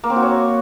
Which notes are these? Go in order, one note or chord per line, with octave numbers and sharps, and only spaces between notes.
A#3
C4
F#4
C#5